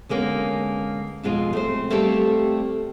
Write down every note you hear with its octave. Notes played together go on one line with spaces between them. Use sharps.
D3 G#3 A#3 B3 C#4
F2 B2 G#3 F4
A3 C4 C5
G3 A3 A#3 C4 G4 A4